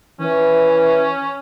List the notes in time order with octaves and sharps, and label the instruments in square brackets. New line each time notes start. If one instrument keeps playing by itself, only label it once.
[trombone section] E3 [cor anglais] C#4